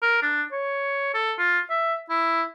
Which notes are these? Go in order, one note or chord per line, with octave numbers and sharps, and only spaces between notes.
A#4
D4
C#5
A4
F4
E5
E4